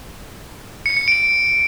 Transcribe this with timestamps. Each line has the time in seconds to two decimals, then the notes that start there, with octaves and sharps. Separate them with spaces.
0.86 C#7
0.97 C#7
1.08 D7